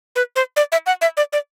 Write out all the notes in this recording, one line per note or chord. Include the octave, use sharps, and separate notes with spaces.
B4
C5
D5
E5
F#5
E5
D5
D5